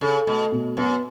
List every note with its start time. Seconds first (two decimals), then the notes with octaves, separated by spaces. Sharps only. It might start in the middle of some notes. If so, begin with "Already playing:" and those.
0.01 C#3 A4
0.27 B2 A3
0.52 B2
0.77 F#2 B3